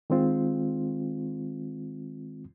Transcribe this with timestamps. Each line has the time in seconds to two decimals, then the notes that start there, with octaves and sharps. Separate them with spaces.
0.10 D#3 G#3 C4 F4